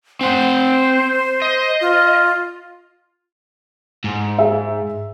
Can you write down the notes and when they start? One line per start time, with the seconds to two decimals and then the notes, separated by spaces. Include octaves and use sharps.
0.21 C4 C5 F#5
1.42 D#5
1.81 F4
4.04 G#2
4.39 G#4 E5